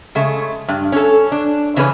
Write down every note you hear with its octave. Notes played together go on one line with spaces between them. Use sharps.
C#3 G#3 A3
G2
C#4 A4
D4
C#3 E3 C#4 G#4 B4